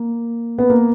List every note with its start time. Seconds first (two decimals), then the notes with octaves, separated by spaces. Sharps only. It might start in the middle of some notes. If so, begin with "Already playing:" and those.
Already playing: A#3
0.58 B3
0.70 A#3